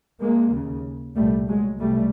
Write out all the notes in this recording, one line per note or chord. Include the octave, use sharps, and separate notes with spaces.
G#3 A#3
D#2 C#3
C2 A#2 G3 A3
F#3 G#3
C2 B2 G3 A3